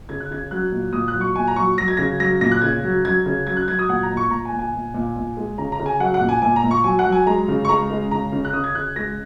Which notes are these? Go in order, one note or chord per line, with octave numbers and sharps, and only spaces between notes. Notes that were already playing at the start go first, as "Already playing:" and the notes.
C#3 G#6
F#6
C#3 G#6
F#3 F#6
A#2
A#2 D#6
F#6
F#3
C#6
A#2 G#5
A#5
F#3 C#6
F#3 A#6
G#6
C#3 A#6
F#3 A#6
A#2 A#6
F#6
C#3 G#6
F#3
F#3 G#6
C#3
F#3 G#6
F#6
F#3 G#6
D#6
A#2 F#5
A#5
A#2
C#6
A#2 A#5
G#5
A#2
G#5
A#2
A#2
A#2
G#3
C#3 A#5
A#5
C#3
G#5
F#3 F#5
F#5
A#2
G#5
A#2 G#5
A#5
A#2
C#6
F#3 G#5
F#5
F#3
G#5
G#3 A#5
C#3
C#6
G#3 A#5
G#3
C#3 A#5
C#3
F#6
C#3 D#6
G#6
C#3 F#6
G#3 A#6